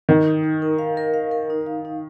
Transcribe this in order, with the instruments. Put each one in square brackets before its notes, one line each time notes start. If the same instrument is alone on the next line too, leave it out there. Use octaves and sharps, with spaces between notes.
[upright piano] D#3 [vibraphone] D#4
[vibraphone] D#4
D#4
A#4
F5
A#4
F5
A#4
D#4
F5
D#4